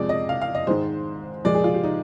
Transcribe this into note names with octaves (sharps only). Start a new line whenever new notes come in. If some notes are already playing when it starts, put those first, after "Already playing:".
Already playing: F2 C3 F3 G#3 D5
D#5
F5
F5
D#5
G#2 D#3 G#3 C5
A#2 F3 G#3 D5
G#4
F4
G4
D#4